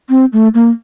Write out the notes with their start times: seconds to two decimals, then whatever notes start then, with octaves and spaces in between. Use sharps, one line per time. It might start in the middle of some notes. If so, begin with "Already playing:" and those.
0.10 C4
0.33 A3
0.54 A#3